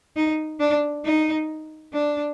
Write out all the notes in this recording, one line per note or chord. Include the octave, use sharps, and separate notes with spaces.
D#4
D4
D#4
D4